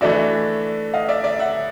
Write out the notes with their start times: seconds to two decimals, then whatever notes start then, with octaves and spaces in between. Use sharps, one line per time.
0.01 E3 A3 D4 F#4 D5 E5
0.94 D#5 F5
1.08 D5 E5
1.24 D5 E5
1.39 E5 F#5